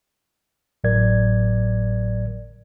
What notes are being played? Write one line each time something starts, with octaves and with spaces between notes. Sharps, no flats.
G#1 A2 F#3 A#4 D5 G#6